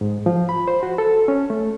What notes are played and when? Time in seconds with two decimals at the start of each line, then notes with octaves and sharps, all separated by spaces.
0.01 G#2
0.26 F3
0.49 B5
0.68 C5
0.83 F#4
0.98 A4
1.28 C#4
1.50 A3